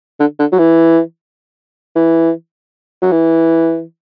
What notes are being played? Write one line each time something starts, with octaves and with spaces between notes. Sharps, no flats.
D3
D3
F#3
E3
E3
F#3
E3